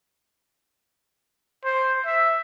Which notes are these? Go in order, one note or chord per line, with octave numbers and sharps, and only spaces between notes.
C5
E5